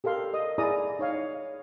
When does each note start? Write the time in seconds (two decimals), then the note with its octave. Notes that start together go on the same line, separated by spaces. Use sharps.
0.04 G4 A4 A#4 F5 C6
0.34 D#5 D#6
0.58 E4 G#4 D5 A#5 D#6
0.99 D#4 C#5 F5